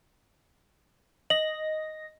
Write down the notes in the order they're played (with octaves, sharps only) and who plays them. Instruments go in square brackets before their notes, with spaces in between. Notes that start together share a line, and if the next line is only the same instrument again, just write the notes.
[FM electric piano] D#5 A#6 [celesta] F#7